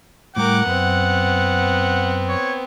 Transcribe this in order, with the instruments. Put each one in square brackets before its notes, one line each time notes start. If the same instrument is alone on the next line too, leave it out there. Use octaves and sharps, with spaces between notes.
[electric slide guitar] A2 G3 G5 [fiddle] A#4 D6 [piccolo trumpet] F#5
[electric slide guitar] F#2 [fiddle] B3 C4
[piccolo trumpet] C#5